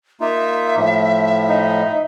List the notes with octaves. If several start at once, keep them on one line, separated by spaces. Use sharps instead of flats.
A#3 D#4 F4 E5
A2 F3
D#4